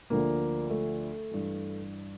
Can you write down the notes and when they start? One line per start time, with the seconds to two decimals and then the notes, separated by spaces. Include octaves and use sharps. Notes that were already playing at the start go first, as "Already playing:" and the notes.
0.10 D2 D3 F3 A#3
0.70 A3
1.31 G2 E3